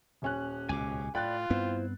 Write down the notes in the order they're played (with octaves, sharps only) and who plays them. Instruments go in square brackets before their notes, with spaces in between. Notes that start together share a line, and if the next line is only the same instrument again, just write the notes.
[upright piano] D#1 C#4 F#6
[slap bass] C#2 B2 [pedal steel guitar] G#5 D6
[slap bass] A2 [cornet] F4 [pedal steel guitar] D5 B5 [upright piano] G5 F#6 A6
[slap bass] G2 B3 C4 [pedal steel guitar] E4 C5